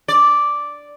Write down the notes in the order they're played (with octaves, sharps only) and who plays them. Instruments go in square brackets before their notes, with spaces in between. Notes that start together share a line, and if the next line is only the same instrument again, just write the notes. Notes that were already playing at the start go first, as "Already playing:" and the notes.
[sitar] D5